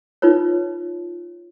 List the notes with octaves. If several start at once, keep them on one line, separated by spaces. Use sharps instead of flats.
D#4 F4 B4 C#5